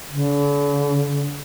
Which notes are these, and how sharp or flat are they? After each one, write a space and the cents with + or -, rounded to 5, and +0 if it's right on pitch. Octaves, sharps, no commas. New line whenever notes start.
D3 -45